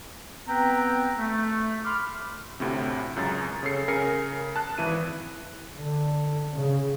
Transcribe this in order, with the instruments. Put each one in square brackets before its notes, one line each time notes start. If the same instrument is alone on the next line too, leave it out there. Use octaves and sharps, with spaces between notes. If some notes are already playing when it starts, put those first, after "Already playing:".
[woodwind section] B3 C4 B4 G5 A#5
A3
B5 C6 D6 F6
[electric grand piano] D2 A2 C3
C#2 F#2 A#5 A6
C#3 C#4 A4 C7 C#7
C#3 A#4 G#5 C7 C#7
A5 F#6
G#1 E3 E4 D#7
[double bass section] D3
C#3